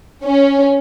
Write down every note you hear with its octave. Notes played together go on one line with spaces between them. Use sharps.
C#4